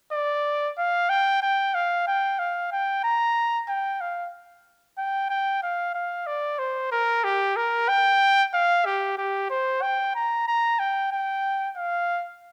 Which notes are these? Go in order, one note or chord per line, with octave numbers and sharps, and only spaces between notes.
D5
F5
G5
G5
F5
G5
F5
G5
A#5
G5
F5
G5
G5
F5
F5
D5
C5
A#4
G4
A#4
G5
F5
G4
G4
C5
G5
A#5
A#5
G5
G5
F5